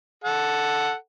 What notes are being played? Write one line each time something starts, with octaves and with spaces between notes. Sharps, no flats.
A4 F#5